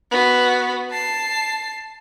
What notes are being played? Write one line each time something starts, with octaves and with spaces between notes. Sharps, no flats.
B3 F#4
A5 C7